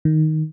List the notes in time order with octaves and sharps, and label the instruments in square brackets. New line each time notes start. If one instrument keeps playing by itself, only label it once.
[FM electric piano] D#3